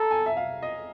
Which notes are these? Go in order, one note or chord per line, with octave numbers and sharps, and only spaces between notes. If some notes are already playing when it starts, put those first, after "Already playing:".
Already playing: A4 A#5
G#5
E5
F5
D#5